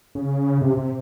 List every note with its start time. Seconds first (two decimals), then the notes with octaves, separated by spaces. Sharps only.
0.15 C#3
0.62 C3
0.77 C3